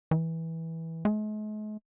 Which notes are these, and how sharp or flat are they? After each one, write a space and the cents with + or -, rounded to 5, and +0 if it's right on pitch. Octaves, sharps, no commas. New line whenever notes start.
E3 -15
G#3 +45